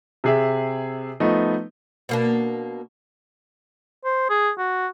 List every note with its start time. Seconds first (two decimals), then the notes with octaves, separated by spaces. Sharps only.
0.24 C3 G#4 E5
1.20 F3 A3 B3 D#4
2.09 B2 A#3 D4
4.05 C5
4.30 G#4
4.58 F#4